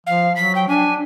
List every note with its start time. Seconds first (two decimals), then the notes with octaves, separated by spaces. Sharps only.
0.07 F3 F5
0.36 F#3 B6
0.55 G5
0.69 D4 G#5